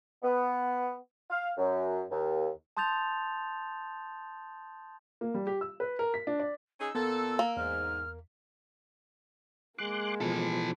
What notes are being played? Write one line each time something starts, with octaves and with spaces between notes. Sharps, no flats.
B3
F5
F#2
D#2
A5 C6 D#6 G6 A6 F7
A#3
G3
G4
E6
B4
A#4
B6
D4
D5
C#4 D#4 G#4 E6
A#2 B3 A4
A#3
E2 G#2 F6
G#3 A#3 C6 D6 F#6
B2 E3 F3 A4